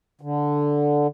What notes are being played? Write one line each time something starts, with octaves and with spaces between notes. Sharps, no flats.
D3